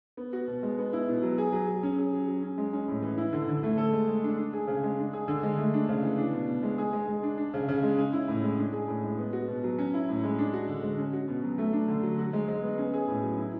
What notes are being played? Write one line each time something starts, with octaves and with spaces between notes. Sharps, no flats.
B3
F#4
B2
G#3
B3
E4
B2
F#3
G#4
F#3
F#3
C#4
G#4
F#3
F#3
C#4
G#3
C#4
A2
E3
E4
D3
D3
A3
A4
G#3
G#3
D4
D4
G#4
C#3
G#3
D4
G#4
D3
G#3
A3
D4
C#3
E3
D4
B2
B2
G#3
G#4
G#3
G#3
D4
D4
C#3
C#3
G#3
C#4
E4
A2
G#3
D4
G#4
A2
G#3
B3
F#4
B2
F#3
C#4
E4
A2
G#3
D4
F#4
D3
G#3
C#4
F#4
B2
F#3
A3
D4
D3
F#3
F#4
G#3
G#3
B3
C#4
G#4
A2
F#3
E4